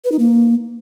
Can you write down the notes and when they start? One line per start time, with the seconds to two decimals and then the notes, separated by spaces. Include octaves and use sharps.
0.05 B4
0.12 D#4
0.19 A#3